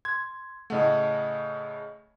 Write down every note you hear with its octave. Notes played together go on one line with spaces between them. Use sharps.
C6 G#6
A2 C#3 A3 D#5 F#5